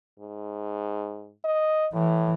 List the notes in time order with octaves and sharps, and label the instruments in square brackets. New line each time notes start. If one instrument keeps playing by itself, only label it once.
[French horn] G#2
D#5
[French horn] A2 [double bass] E3